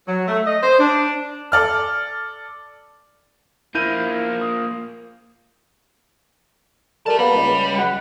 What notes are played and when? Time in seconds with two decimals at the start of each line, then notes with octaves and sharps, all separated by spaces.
0.07 F#3
0.28 A3
0.47 D#5
0.63 C5
0.79 D4
1.52 A4 D5 F6
3.75 F3 A#3 E4 G6 D#7
4.41 D#6
7.06 G3 A4 A#4 E5 A5
7.19 G3 A#3 B3
7.36 C#2
7.78 F#5